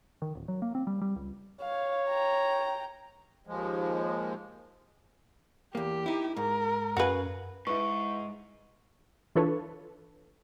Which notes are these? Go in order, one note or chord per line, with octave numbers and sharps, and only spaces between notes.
D#3
D1
F#3
A#3
C4
G3
G3
C#2
C#5 F5
G5 A#5
D#2 F3 G#3
E2 A#3 G4
D#4 E4
G#2 A#4
F#2 F#4 A#4 B4 F5 G#5
G#2 E4 B4 C#6
E3 D4 F4 A4 B4 C#5